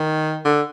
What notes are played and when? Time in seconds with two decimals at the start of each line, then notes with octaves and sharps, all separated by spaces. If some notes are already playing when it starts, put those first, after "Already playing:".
Already playing: D#3
0.45 D3